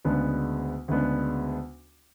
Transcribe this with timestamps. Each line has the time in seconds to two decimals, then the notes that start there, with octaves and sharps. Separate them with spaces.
0.05 D2 C#3 G#3 B3 D4
0.88 D2 C#3 G#3 B3 D4